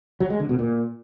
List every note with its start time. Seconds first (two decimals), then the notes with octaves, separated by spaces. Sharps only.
0.20 F#3
0.30 G#3
0.40 D3
0.49 B2
0.59 A#2